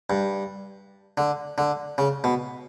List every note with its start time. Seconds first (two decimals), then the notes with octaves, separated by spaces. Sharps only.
0.10 G2
1.17 D3
1.58 D3
1.98 C#3
2.24 B2